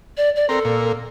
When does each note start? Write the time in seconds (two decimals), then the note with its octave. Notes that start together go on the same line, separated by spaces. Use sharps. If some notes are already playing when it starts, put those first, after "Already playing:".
0.17 D5
0.36 D5
0.49 C4 A4 A#4
0.65 A#2